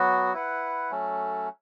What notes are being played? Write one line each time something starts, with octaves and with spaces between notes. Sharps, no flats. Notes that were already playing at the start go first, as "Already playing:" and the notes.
Already playing: F#3 B3 F#4
E4 B4 F#5
F#3 A3 C#4 A4